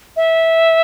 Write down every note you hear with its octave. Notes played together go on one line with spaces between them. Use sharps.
E5